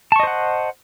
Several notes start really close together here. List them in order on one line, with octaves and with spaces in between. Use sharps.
A5 C#6 D#5 C5 F#5